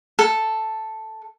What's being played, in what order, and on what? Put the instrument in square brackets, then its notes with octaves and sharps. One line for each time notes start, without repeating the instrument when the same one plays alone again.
[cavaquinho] A4